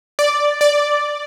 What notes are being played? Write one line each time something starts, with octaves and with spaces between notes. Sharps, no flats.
D5
D5